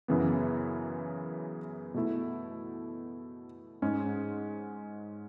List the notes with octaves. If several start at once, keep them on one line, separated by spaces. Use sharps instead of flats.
F#2 C#3 E3 B3
B2 A3 E4
G#2 G#3 C#4